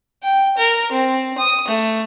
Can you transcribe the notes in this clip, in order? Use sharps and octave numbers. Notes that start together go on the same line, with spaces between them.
G5
A#4
C4
D#6
A3